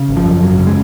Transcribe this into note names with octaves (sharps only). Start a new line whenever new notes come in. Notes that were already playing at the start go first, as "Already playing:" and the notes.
Already playing: C#3
G#1
F3
F#2
G#1 F#3
C#3
G#3